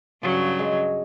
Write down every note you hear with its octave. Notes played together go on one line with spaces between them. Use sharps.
G2 C#3 F#3
G#3